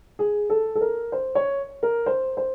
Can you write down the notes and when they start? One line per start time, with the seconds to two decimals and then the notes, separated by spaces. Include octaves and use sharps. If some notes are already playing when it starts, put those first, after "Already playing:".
0.19 G#4
0.50 A4
0.75 A4
0.81 A#4
1.12 C5
1.35 C#5
1.83 A#4
2.06 C5
2.37 C5